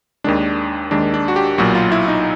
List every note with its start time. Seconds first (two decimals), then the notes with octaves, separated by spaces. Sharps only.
0.24 D#2 D#3 G#3 D4
0.91 D#2 D#3 G#3 D4
1.14 D4
1.28 F#4
1.36 G4
1.58 B1 A#2 F#3 F#4
1.75 F4
1.92 E4
2.08 D#4